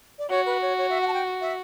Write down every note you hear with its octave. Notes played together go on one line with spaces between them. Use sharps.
D5
F#4 C#5
B4
C#5
C#5
E5
F#5
A5
G5
E5